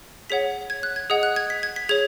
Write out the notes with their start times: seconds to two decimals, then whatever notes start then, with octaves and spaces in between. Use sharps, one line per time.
0.30 G#4 C#5 F#5 B6
0.70 G#6
0.83 F#6
0.96 G#6
1.10 G#4 D#5 F#5 D#6
1.23 F#6
1.36 G#6
1.50 B6
1.63 G#6
1.76 B6
1.89 G#4 C#5 G#6